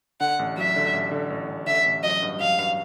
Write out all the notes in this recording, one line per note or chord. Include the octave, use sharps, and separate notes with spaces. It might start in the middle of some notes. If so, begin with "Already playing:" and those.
D3 F#5
A1
F#3 E5
D3
A1
D3
A1
A1
D3 E5
A1
F#3 D#5
G2
F#3 F5
G2